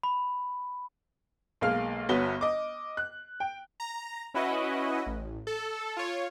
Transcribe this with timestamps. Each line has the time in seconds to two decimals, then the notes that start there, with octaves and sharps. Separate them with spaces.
0.03 B5
1.61 B1 G#3 A#3 F5 F6
2.09 G1 B3 F#4 C#5 G7
2.41 D#5 D6
2.97 F#6
3.40 G5
3.80 A#5
4.34 C#4 E4 F#4 B4 D#5
5.06 A1
5.47 A4
5.97 F4 C#5